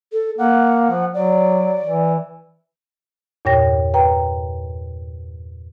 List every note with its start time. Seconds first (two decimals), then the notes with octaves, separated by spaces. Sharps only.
0.13 A4
0.38 A#3 F#5
0.91 F3
1.14 F#3 D5
1.84 E3
3.45 E2 G2 A#2 C#5 G5 A#6
3.94 B4 G5 A#5